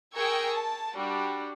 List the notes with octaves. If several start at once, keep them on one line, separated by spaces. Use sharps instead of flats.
G#4 A#4 G5 C#6 E6 G#6
A5
G3 D4 F#4